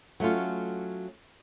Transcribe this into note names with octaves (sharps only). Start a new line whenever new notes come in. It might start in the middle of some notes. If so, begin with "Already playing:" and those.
F#3 A3 C#4 F4